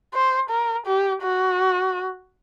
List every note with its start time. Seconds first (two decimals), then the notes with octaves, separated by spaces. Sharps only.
0.14 C5
0.50 A#4
0.87 G4
1.23 F#4